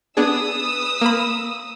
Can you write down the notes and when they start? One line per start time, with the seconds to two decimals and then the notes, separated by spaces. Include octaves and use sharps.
0.17 B3 D4 G#4 B4 D#6 E6
1.01 A#3 B5